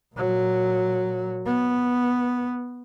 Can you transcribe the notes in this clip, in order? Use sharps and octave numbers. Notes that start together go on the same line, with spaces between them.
A#2 F#3
B3